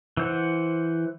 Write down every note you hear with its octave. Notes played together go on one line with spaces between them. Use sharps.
E3 C5 F#5